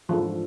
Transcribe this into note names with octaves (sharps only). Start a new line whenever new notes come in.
G#2 E3 F3 A3 D4 A4